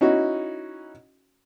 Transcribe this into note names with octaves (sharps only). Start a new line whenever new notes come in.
C#4 D#4 E4 F#4